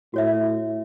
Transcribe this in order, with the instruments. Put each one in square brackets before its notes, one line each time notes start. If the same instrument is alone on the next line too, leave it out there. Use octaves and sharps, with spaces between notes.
[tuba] A2 [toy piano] F#4 C#5 E5